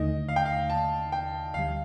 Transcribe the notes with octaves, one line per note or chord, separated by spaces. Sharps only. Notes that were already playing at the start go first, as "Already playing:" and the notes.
Already playing: D#2 D3 A3 D#4 D#5
F5
G5
F5
A5
G5
D2 D3 G3 F5